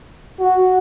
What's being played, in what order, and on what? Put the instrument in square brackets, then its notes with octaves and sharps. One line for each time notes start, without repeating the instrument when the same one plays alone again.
[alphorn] F#4